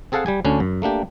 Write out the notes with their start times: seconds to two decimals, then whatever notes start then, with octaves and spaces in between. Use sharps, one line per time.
0.12 C4 G#4 A4 F5 F#5 A5
0.26 G3 G4 G#5
0.45 D2 D3 C#4 D4
0.60 F#2
0.82 A3 A#3 D4 G4